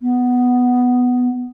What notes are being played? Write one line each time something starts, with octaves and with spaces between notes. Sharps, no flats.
B3